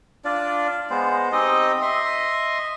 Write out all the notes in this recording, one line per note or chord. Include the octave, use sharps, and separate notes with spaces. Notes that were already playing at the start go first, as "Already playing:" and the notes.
D4 F4 D5
G#3 B3 C5
C4 D#4 G4 D#5
D#5 E5 C6